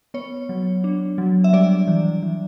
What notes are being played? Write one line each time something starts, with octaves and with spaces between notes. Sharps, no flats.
B3 C#5
F#3
D4
F#3
E5
G3 D5
E3
E3